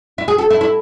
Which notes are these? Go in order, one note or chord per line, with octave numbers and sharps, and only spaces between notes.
E4
G#4
A4
E4
E4